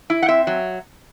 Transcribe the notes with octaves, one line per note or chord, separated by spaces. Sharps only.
E4
F#5
C4 E5
F#3